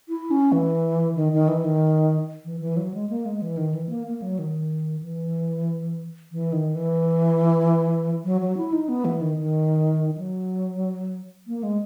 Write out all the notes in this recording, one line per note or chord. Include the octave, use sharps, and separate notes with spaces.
E4
C#4
E3
D#3
D#3
E3
D#3
E3
E3
F#3
G#3
A#3
G#3
E3
D#3
E3
A#3
A#3
F#3
D#3
E3
E3
D#3
E3
F#3
F#3
E4
D#4
B3
E3
D#3
D#3
F#3
A#3
G#3